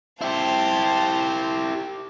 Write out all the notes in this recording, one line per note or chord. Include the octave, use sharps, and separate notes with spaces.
E4 G4 C5 F5 A5